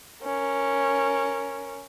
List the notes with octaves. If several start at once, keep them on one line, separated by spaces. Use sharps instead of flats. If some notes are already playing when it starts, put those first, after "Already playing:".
C#4 A#4